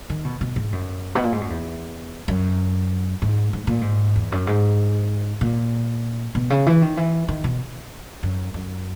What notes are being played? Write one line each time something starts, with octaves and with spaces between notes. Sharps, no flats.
D#3
B2
B2
G#2
F#2
B2
A#2
G#2
F#2
E2
F#2
G#2
G#2
A#2
G#2
E2
F#2
G#2
A#2
B2
C#3
E3
D#3
E3
D#3
B2
F#2
F#2